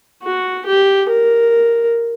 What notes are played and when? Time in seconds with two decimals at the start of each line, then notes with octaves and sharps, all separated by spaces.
0.23 F#4
0.67 G4
1.10 A#4